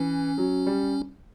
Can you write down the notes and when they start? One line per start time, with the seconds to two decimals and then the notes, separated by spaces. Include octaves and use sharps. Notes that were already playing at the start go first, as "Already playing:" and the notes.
Already playing: E3 C#4
0.38 F#3
0.67 G3